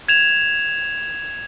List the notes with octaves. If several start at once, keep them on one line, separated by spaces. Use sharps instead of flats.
G#6 E7 F7